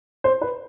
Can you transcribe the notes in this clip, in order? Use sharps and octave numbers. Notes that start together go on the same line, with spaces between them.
C5
B4